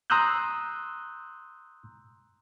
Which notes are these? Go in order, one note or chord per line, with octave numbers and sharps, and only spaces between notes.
A#5 C6 D#6 E6 F#6 G6